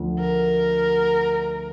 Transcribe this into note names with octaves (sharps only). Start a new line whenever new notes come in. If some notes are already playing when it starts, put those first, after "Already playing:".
Already playing: D2 D3 F3
A#4